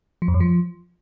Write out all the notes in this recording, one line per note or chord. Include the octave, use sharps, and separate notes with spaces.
F3
F2
F#2
F3